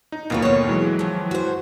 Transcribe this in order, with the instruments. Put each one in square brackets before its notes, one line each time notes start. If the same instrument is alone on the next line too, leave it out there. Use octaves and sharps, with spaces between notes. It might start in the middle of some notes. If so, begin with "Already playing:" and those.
[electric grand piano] D#4
[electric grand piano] D#2 B2 A#3 [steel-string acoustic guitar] F#3 F4 B4
[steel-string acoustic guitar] D3 C#5
[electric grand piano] E3 F#3 G#3
[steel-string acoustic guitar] D#3 F3
F#4 C5